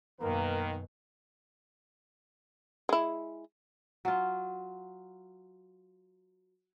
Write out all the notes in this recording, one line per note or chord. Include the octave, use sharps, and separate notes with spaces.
F#2 B2 D#3 A#3 A#4 B4
G#3 E4
F#3 F4